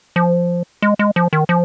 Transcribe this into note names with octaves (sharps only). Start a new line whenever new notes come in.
F3
G#3
G#3
F3
D#3
F3